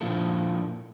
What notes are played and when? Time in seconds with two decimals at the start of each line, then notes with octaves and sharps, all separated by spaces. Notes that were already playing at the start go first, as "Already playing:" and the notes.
0.01 A#2 F3 A#3 D4 E4 A4